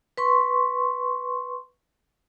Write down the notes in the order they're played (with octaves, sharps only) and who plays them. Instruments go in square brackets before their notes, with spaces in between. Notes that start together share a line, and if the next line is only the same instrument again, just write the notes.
[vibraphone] B4 C6 C#6